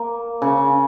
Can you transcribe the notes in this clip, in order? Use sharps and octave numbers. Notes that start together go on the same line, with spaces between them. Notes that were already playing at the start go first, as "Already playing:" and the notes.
Already playing: A#3
C#3